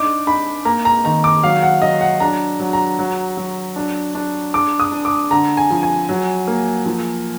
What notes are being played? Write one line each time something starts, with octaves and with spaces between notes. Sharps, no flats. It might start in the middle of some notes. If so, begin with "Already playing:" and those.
Already playing: D4 D#4 D6
D#4 B5
A#3 A#5
A#5
D#3 A#5
D6
F#3 F5
F#5
F#3 D#5
F#5
D4 A#5
F#3
A#5
F#3
F#3
D4
D4
D4 D6
D#6
D4
D6
D3 A#5
G#5
F3
G#5
F#3
A#3
F3